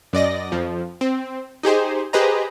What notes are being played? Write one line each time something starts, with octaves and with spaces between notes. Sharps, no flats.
F#2 D5 D#5 A#6
F2 F3
C4
D#4 G4 G#4 C5
G4 G#4 B4 C5 D#5 A#5